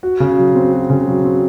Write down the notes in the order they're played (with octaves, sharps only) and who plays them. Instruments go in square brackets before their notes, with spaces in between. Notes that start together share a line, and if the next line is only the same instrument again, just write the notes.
[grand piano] F#4
C#3
F#3
C4
F#4
C#3
F#3
C4